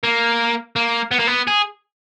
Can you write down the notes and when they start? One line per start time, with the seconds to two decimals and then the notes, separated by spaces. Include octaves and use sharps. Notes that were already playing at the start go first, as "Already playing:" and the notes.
0.04 A#3
0.76 A#3
1.11 B3
1.19 A#3
1.27 B3
1.47 G#4